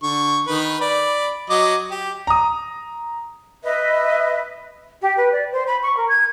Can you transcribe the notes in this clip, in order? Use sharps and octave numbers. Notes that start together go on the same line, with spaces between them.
D3 C#6
D#3 B4 B5
D5 B5
F#3 D#5 D6
G4
A#5 D#6
B4 D#5 E5
G4
B4
D5
C5
B5
C#6
A#4
G#6